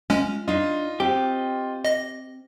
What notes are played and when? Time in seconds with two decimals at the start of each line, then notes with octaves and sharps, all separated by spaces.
0.10 G#3 C#4 F4
0.48 D4 D#4 F4 D#5
1.00 C4 G4
1.85 D#5 A#6